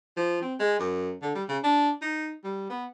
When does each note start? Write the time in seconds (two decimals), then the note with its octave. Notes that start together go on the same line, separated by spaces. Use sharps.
0.17 F3
0.42 C4
0.60 G#3
0.79 F#2
1.22 D3
1.35 G3
1.48 C#3
1.63 D4
2.01 D#4
2.44 G3
2.69 B3